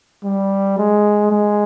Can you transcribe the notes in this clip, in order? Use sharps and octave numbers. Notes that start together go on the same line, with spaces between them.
G3
G#3
G#3